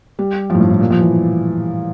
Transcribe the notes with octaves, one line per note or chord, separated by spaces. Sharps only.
G3
F3
A2
G2
A2
A#2
F3
E3